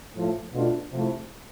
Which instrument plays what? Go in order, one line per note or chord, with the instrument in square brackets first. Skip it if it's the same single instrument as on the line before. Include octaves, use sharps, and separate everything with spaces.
[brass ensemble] A2 F3 A3
B2 A3 D4 F4
C3 F3 A3 E4